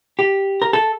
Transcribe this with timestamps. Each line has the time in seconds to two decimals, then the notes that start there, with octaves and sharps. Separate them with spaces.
0.19 G4
0.62 A#4
0.73 A4